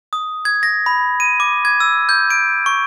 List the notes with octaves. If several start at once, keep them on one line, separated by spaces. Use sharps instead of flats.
D#6
G#6
A#6
B5
D#7
D6
G#6
E6
G6
D7
C#6